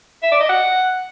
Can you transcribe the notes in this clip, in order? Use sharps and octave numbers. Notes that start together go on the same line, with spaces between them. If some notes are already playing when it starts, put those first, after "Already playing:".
E5
D5
D#5
F#5